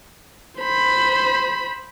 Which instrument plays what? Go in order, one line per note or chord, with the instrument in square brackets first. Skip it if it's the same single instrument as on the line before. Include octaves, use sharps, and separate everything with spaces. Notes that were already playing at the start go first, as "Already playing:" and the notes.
[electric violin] C5 B5